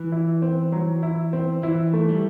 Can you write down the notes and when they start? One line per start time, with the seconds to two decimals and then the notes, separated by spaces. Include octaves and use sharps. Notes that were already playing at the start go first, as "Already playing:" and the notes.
Already playing: E3
0.12 E4
0.42 C4
0.72 F#3
1.03 E4
1.33 C4
1.63 E3 E4
1.93 A3
2.09 G3